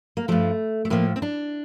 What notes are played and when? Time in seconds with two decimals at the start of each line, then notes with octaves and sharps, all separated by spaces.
0.17 A#3
0.28 G2 F3 A3
0.85 A3
0.90 A2 F3 A#3
1.16 C4
1.22 D4